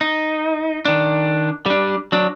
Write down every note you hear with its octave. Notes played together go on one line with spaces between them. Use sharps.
D#4
D#3 D4
G3 D4
F#3 D4